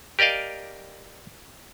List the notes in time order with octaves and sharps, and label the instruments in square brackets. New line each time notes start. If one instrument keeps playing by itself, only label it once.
[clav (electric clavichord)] G4 A#4 D5 D#5 F5